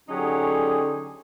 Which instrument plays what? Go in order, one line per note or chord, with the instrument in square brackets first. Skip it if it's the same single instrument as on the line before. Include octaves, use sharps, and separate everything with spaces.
[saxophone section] D3 F#3 C#4 D#4 G4 G#4